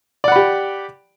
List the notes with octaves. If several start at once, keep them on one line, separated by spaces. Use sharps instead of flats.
G4 D5 F#5 B5